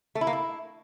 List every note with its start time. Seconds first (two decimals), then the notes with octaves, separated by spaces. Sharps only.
0.15 A3
0.21 E4
0.27 A#3
0.33 E4